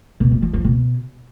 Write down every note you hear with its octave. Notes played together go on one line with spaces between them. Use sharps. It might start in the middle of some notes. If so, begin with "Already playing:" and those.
B2
A3
F3
F3
B2